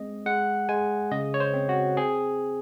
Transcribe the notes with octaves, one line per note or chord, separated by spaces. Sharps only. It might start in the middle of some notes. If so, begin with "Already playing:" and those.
Already playing: G#3 C4 D#5
G#3 F#5
G#3 G#5
C#3 D#5
C#5
C5
C4
F#4
C4 G#4